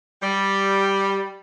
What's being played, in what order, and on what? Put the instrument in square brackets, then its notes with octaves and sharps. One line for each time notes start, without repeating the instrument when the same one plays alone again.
[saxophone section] G3